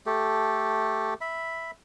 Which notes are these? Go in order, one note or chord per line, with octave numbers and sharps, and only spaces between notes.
A3 G4 A4
E5 B5